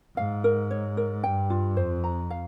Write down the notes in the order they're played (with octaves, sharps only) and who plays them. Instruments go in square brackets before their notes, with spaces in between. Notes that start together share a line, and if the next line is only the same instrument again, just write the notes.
[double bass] G#2 [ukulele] F5
[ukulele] A#4
C#5
A#4
[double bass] G2 [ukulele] G5
[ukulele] F4
[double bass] F2 [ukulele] C5
[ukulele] A#5
F5